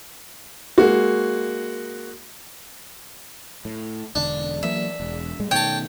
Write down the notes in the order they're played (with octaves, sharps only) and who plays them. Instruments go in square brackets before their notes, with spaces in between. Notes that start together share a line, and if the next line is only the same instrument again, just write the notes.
[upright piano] G#3 A#3 F#4
[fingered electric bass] A2
[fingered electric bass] E1 D3 [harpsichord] D4
[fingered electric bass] E3 F#3 A#3 [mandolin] E5
[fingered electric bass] E1
A2 G3 G#3
[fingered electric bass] B2 D#3 A3 [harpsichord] C#5 A5 [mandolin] G5